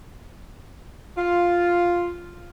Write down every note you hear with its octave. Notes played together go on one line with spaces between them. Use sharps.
F4